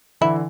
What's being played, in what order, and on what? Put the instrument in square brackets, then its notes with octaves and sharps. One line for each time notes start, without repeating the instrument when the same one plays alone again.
[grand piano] D3 E3 [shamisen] E4